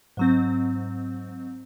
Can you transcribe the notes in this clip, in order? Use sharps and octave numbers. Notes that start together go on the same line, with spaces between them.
G#2 F#3 C4